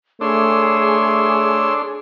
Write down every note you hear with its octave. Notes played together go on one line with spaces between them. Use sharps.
A3 D4 G#4 C#5 C6 E6